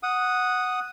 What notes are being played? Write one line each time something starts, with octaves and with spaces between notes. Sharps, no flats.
F#5 D#6